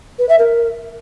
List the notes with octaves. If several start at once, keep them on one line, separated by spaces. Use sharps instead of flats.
B4
E5
A#4